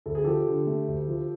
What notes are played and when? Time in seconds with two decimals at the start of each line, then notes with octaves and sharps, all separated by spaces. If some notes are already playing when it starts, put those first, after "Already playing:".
0.06 D2 A4
0.15 G#4
0.24 F3 G4 A4
0.47 D3
0.67 A3
0.88 D2
1.08 F3